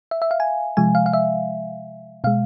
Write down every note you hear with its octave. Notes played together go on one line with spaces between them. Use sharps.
E5
E5
F5
G#5
C3 F3 G#3 G#5
F5
F5
E5
B2 G#3 F5